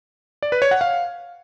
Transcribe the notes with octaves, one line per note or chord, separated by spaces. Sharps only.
D5
B4
C#5
F#5
F5